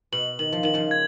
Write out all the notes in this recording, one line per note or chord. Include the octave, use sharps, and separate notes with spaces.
B2 F#7
D#3 F#7
F3
D#3 F#7
C#3 F3
G#6